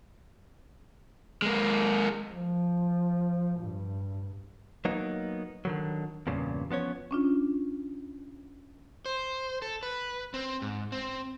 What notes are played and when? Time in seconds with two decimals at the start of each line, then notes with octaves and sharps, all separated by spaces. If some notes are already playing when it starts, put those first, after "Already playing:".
1.42 G#3 A#3
2.32 F3
3.60 G2
4.85 F#3 A#3 B3 D#4
5.65 D3 D#3 F#3
6.27 E2 G2 A#2 C#3
6.71 F3 B3 C#4 C#5
7.11 C#4 D4 F4
9.06 C5
9.62 A4
9.83 B4
10.34 C4
10.62 G#2
10.92 C4